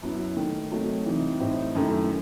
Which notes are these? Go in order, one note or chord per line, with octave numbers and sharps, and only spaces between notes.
F#2 F#3 B3 E4
D#3 A3 D#4
C3 F#3 A3 D#4
C3 E3 G3 D#4
A2 G3 C4 D#4
F#2 D#3 A3 E4